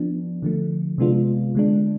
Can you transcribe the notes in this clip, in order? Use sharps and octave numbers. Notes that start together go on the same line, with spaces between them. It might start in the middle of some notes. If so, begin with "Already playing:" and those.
Already playing: F3 B3 D4
D3 F3 A3
C3 G#3 B3 D4 F4
D3 G#3 D4